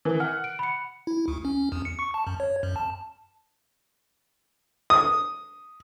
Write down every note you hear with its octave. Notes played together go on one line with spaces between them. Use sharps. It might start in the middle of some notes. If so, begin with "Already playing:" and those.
E3 A#4
F#5 F6
D7
B5 C#7
E4
D2
C#4
E2
C#7
C#6
A5
F#2
C#5
F#2
A5
D#6